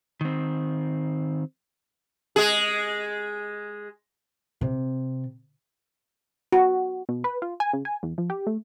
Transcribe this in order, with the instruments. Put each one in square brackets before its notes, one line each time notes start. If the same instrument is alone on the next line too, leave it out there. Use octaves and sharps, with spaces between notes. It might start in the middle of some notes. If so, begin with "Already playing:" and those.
[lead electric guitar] D#3 C4
[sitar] G#3 G#4
[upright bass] C3
[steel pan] F#4
[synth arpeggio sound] B2
B4
F4
G#5
C#3
G#5
E2
F3
G4
A3